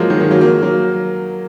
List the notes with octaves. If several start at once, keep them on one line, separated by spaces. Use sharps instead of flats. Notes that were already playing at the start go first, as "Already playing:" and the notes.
Already playing: F3 F#3 G#3 A#3
D#3 F#3
D#3 F#3
F#3 A#3
F#3 A#3
F#3 A#3